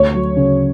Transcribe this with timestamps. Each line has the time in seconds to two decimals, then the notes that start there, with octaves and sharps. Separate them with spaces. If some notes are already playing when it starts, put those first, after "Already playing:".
Already playing: D2 C#5
0.14 F#3
0.37 C#3